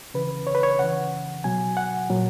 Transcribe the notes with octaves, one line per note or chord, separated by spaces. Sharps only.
C#3 E3 B4
C#5
B4
C#5
C#3 E3 F#5
B2 F#3 G#5
F#5
A#2 F#3